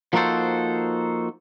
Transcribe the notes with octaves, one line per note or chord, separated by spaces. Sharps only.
F3 A#3 D#4 F#4 A4 C5